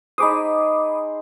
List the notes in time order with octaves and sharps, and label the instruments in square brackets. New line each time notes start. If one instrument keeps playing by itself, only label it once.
[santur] D#4 G#4 C5 [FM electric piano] B5 D6 D#6